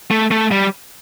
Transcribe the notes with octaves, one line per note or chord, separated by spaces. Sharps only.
A3
A3
G3